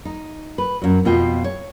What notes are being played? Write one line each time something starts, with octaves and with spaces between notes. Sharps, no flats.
D#4
B4
F#2 F#3
F2 B2 B3 F4 D#5 G5
C#5